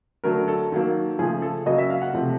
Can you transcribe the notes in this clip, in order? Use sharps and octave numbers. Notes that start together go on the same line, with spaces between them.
D3 F#3 A3 A#4
A4
D#3 F#3 A#3
C#3 F3 A3 G#4
A4
C#3 F#3 A#3 D#5
E5
F5
F#5
C3 F3 A3